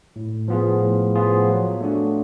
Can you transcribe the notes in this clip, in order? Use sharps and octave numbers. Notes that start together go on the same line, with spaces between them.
A2
F3 B3 F4 G#4
A2
F3 B3 F4 G#4
F#3
A3 D4 F#4